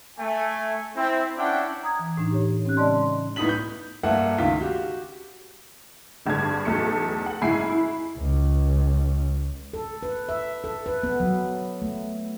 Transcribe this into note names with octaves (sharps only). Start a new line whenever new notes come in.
A3 G#5
C4 E4
C#4 D4 E4 F#5 G5
A#5 D#6 G#6
E3
A2 D4 D#4
G4 C#5
C4 C#4 G4 F#6
C#3 G#3 D5 D#5 A5 C6
A2 B3 D#4 D#6 B6 F#7
G6
G2 A3 A#3 E5 F#5
C#2 D#3 F4 B6
F#4 G4
G#1 G2 D3 G#4 G#6
B1 E2 A3 A4 C#7
F#5
F#1 G#2 E4 G#5 C7
E4
C#2
A4
B4
E5
A4
B4
B3
F#3
A3